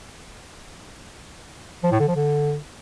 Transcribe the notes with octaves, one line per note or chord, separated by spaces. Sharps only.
F3
A2
D3
F3
D3